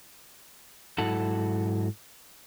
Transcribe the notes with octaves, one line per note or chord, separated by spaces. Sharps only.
G#2 F#3 E4 A4 F#5 A5